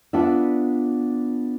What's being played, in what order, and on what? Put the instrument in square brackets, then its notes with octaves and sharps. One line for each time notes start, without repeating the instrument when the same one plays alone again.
[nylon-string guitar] B3 D4 F4 D5 E5